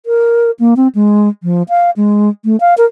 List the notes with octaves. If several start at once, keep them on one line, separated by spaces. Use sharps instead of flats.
A#4
A#3
C4
G#3
F3
F5
G#3
A3
F5
A#4